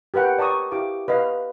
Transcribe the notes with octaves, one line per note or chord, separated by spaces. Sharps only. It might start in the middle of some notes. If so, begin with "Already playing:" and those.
G4 A#4 B4 F#5 G5
D5 A5 A#5 C#6 D#6
E4 G4 F5 D6
B4 D#5 F5